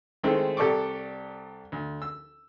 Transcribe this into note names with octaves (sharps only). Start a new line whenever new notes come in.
D#3 G#3 A3 C4 E4
C2 G4 A4 D5 C#6 D6
D2
E6